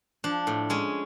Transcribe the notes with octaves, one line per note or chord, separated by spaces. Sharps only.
F3 D4
A2
G#3 C#4